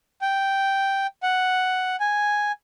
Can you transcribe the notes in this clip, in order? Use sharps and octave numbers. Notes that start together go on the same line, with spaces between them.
G5
F#5
G#5